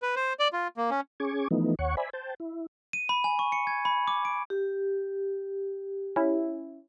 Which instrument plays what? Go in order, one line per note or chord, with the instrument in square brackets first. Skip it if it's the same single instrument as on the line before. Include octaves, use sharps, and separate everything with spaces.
[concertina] B4
C5
D5
F4
A#3
C#4
[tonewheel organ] C#4 G#4 C#6 D6 G#6
E3 F3 A3 B3 D#4
D#2 C#5 F#5 C#6
C5 D5 E5 G#5 B5
C5 G5 A5
E4
[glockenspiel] D#7
B5
G#5
C#6
C#7
G#6
B5
D6
D7
[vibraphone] G4
[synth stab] C#4 E4